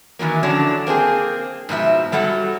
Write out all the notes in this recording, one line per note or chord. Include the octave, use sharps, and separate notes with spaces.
D#3 E3 F#3 A#3
D3 F3 F#3 C#4 D4
A#3 C4 D4 G#4
G#2 B2 F3 E5
F#3 G3 A4 F#5